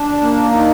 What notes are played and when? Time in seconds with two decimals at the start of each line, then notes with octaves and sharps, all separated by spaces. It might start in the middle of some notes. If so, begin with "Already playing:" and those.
Already playing: D4
0.21 A#3
0.51 D#4